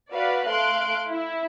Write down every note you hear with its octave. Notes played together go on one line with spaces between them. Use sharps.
F#4 B4 D5 F5
A3 F5 C6 F#6 D7
E4